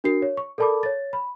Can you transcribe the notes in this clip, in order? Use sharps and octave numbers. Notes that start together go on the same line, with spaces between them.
D4 F#4 A#4 C7
C#5
C#6
A4 A#4 D5 A5 B5 D6
C#5 A6
B5